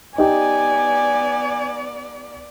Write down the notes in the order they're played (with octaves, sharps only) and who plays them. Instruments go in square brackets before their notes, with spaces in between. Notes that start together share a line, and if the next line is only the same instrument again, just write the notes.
[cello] B3 D5 [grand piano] D#4 G4 [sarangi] G#5